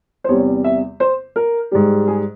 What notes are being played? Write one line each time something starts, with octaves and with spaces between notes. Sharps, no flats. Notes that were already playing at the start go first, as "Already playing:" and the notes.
C5
E2 C3 G3 C#5
E5
C5
A#4
G#2 G3
G#4